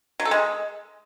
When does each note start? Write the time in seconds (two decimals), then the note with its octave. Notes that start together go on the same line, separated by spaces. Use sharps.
0.20 F#3
0.25 A4
0.31 G#3